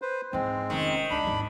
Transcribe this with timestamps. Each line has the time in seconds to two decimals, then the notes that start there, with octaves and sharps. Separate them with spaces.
0.02 B4 C5
0.33 G#2 E3 G#3 C4
0.70 F1 D#3 C#4
1.10 C#2 D4 B5
1.23 G#1 D#2